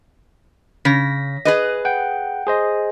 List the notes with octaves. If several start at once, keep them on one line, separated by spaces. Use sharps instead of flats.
C#3 A#6 B6
G#4 B4 D#5
F#5 G5
G#4 C5 D#5